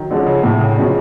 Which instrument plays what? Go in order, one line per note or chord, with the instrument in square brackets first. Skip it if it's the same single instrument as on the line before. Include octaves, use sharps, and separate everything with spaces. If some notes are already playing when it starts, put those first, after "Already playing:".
Already playing: [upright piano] D#3 F#3
[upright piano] D3 [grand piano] F3 G#3 C#4
[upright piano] C#3
[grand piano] A2 [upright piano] C3
[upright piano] C#3
[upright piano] B2 [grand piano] F3 G#3 C#4